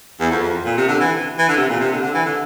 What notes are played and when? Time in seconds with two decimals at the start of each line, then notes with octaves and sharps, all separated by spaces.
0.20 E2
0.31 F2
0.43 F2
0.65 A#2
0.77 C3
0.88 D3
1.00 E3
1.38 E3
1.48 D3
1.57 C3
1.69 A#2
1.80 C3
1.92 D3
2.02 D3
2.14 E3
2.26 D3